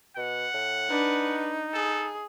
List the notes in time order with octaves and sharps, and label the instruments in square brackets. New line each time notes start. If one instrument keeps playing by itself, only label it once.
[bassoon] B2 [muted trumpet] F#5
[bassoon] A2
[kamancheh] D4 B4 [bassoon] D#4
[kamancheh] G#4 [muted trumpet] A4